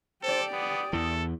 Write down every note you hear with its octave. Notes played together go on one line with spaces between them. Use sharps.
G4 A4 C5 D5
B3 D#6
E2 E3 A4